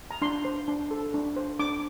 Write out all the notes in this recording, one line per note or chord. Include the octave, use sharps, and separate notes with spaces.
A#5
D4 C6
C5
D4
A4
D4
C5
D4 D6